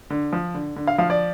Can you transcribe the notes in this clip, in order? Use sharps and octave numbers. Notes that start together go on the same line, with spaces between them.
D3
F3
D3
D3
F5
F3 F5
D5